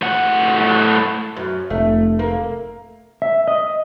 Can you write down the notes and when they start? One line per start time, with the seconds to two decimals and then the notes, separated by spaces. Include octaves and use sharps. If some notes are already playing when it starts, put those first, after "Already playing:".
0.02 A2 F#5
1.37 F#2
1.70 F1 A3
2.19 A#3
3.22 E5
3.48 D#5